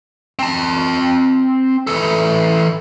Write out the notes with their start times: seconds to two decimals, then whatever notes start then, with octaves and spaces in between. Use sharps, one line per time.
0.39 C4 A5
1.87 E3 A4